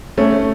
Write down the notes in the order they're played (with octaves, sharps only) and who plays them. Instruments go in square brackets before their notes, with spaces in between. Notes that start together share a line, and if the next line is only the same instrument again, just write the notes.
[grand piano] A3 C#4